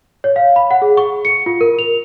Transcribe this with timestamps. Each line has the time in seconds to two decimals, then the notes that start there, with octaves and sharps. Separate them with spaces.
0.24 C#5
0.36 F5
0.56 B5
0.71 F#5
0.82 G#4
0.97 C#6
1.25 C#7
1.46 F4
1.61 A#4
1.79 F7